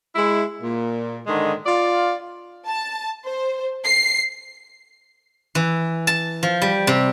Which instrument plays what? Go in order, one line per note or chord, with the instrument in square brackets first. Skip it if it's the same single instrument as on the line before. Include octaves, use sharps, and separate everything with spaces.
[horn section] G#3 E4
A#2
G#2 D3 D#3 G#3
F4 D5
[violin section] A5
C5
C7
[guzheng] E3
A5
F3
G3
C3